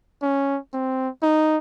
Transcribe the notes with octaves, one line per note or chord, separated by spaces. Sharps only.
C#4
C4
D#4